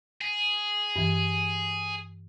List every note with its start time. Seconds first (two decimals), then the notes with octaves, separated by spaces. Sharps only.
0.21 G#4
0.96 G2 E3